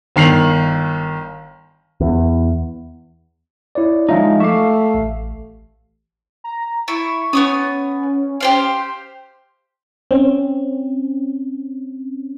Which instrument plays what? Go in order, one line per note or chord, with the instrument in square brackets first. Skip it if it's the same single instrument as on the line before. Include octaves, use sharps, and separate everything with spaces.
[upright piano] G1 D#3 C7 F7 F#7
[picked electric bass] E2
[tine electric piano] E4 C#5 D5
[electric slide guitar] F3 G#3 D#4 [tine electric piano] F4 E5 F5
[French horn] A3 [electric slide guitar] E5 F5 [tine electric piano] C#6 D6
[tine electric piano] A1
[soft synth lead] A#5
[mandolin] E4 [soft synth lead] C#6
[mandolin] B3 C#6 D#6 [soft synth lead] C#4
[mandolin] G4 C5 F5
[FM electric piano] C4 C#4